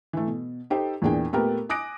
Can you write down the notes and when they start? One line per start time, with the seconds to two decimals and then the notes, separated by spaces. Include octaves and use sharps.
0.13 E3 A3
0.27 B2
0.70 D#4 G4 A4 C5
1.02 E2 A#2 E3 D4 G#4 G5
1.33 A#2 A3 B3 G4 A#4
1.69 G#5 D6 D#6 F#6 A#6 D7